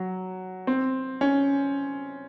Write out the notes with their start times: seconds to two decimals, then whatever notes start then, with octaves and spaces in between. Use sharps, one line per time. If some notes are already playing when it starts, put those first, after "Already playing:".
Already playing: F#3
0.67 C4
1.21 C#4